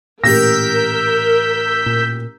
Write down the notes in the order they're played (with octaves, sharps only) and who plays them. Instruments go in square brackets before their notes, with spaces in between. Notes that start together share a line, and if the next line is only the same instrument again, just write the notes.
[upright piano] A1 G4 A#6 [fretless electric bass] A#2 [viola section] A#4 [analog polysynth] E6 G6 B6
[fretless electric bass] A#2